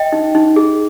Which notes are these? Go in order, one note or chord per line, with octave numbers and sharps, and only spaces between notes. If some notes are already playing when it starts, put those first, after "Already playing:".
Already playing: D#5 G5
D#4
D#4
G#4